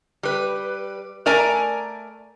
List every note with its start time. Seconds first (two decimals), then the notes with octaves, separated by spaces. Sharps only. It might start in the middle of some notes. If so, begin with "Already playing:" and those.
0.23 G3 B4
1.26 A3 A#4 D5 G#5 A#5